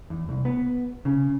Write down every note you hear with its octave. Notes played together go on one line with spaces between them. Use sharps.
E2
C2
B3
C#3